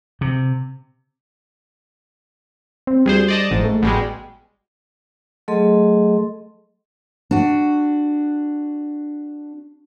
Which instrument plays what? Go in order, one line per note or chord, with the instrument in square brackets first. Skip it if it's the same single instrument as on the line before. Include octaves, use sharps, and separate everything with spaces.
[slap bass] C3
[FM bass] C4
[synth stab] D2 G#4 C5 [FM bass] G3
[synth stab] D5 D#5 A5
[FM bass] A1 [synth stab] G#2
[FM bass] A3
[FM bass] A1 [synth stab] B2 G3 G#3
[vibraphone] F#3 A3 G#4 A4 D#5 C6
[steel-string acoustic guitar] D4 F#4